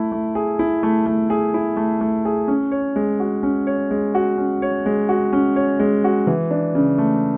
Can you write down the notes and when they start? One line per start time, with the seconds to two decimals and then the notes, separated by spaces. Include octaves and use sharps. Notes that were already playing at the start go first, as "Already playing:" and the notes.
Already playing: A3 E4
0.12 A3
0.35 G#4
0.59 E4
0.83 A3
1.06 A3
1.30 G#4
1.54 E4
1.77 A3
2.01 A3
2.25 G#4
2.48 C#4
2.72 C#5
2.96 G#3
3.20 F#4
3.43 C#4
3.67 C#5
3.91 G#3
4.15 F#4
4.38 C#4
4.62 C#5
4.86 G#3
5.09 F#4
5.33 C#4
5.56 C#5
5.80 G#3
6.04 F#4
6.27 E3
6.51 D4
6.75 C#3
6.98 A3